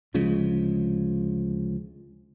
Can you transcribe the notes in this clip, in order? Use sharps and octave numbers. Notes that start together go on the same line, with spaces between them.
D2 C#3 F3 G#3